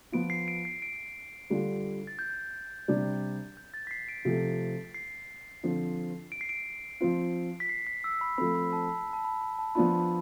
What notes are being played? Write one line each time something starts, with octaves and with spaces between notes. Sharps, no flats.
F3 B3 F4 D7
C7
D7
C7
D7
D3 G3 D4 F4
A6
G6
C3 G3 D4 G4
G6
A6
B6
C7
D7
C3 F3 A3
C7
D3 F3 C4
D7
C7
D7
F3 C4 F4
B6
C7
B6
E6
B5
F3 A3 C4 B5
B5
A5
B5
A5
B5
B5
A5
F3 B3 D4 F4 B5